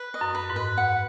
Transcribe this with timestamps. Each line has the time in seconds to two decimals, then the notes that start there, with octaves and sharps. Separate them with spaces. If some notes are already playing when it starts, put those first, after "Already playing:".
Already playing: B4
0.14 D#5
0.21 F#2
0.35 B4
0.50 G#2
0.56 B4
0.77 F#5